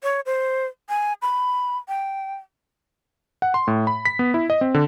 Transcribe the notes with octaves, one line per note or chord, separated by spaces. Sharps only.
C#5
C5
G#5
B5
G5
F#5
C6
A2
B5
B6
B3
E4
D#5
C4
D3